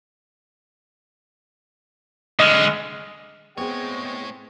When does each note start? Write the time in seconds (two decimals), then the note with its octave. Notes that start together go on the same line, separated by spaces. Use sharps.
2.40 D3 G#3 D#5 F6
3.58 G#3 A3 B3 C4 G#4 C#5 G5